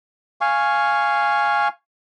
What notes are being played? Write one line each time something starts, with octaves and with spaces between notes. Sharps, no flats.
F5 G#5 C#6